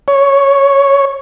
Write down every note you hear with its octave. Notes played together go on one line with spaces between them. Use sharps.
C#5